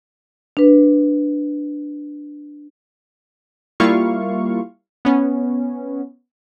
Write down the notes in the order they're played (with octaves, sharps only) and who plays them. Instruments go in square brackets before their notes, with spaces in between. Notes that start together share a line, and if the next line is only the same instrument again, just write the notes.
[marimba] D4 B4
[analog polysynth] G3 A#3 E4 F4 F5 C#6
B3 C#4